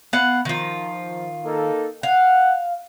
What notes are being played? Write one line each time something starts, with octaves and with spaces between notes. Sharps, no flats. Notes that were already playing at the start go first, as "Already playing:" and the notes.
B3 F5 F#5
D#3 F3 F4
A#3 D#4 A4
F5 F#5